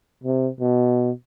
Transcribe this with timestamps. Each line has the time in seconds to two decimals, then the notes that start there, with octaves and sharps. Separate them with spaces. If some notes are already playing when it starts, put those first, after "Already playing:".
0.24 C3
0.60 B2